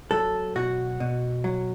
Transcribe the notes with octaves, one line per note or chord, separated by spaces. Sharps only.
F#3 A4
B2 F#4
B2
F#3